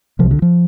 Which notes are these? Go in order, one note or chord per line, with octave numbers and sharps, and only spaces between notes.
C2 C3 F3
D3
F3